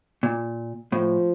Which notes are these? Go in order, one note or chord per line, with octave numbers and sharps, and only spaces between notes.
A#2
A2 F3